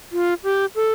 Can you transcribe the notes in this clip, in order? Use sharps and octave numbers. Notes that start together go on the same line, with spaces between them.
F4
G4
A4